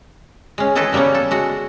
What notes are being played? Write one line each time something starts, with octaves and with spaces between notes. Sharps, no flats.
G#3 C#4
D#3 E3 G#4 A4 B4 D#5
C#3 G3 A#3 B3 C#4
A4
G#3 F#4